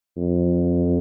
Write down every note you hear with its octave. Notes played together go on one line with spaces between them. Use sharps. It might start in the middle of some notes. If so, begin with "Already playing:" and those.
F2